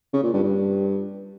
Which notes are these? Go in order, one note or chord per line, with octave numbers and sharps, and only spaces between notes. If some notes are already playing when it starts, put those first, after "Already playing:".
C#3
A#2
G2
G2